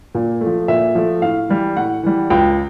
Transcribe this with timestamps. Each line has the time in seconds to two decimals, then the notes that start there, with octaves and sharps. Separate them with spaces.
0.15 A#2
0.41 A3
0.46 F3
0.68 A#2 E5
0.95 F3 A3
1.22 A2 F5
1.49 E3 G3
1.77 A2 F#5
2.03 E3 G3
2.30 C#2 G5